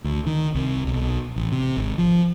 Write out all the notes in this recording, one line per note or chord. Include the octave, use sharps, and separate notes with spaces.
D2
D#3
C2
B1
A1
C3
G#1
F3